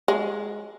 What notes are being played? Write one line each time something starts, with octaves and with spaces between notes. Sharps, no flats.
G#3